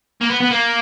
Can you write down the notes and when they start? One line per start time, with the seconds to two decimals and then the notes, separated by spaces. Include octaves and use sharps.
0.21 A#3
0.30 B3
0.40 B3
0.51 A#3